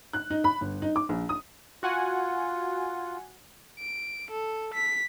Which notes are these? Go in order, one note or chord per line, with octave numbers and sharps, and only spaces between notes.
F#6
D#4
B5
G1
D#4
D6
A#1
D#6
F4 F#4 F#5 G#5
D7
A4
B6